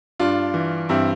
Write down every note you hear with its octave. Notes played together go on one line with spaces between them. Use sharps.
G2 D4 F4
E3
G2 C4 E4